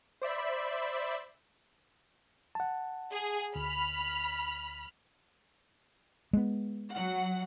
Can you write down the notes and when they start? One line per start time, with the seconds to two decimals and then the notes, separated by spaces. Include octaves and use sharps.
0.22 C5 D5 E5 B5
2.55 F#5 A5
3.12 G#4
3.56 D2 B5 F6
6.33 G#3 B3
6.92 F#3 F#5